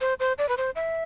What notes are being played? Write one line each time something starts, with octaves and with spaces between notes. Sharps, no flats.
C5
C5
D5
B4
C5
E5